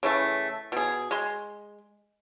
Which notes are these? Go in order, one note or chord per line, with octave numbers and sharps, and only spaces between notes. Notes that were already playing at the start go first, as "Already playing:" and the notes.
C#3 E3 A3
B2 G#4
G#3 C6